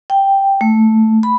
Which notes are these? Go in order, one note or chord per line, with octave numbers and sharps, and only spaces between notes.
G5
A3
B5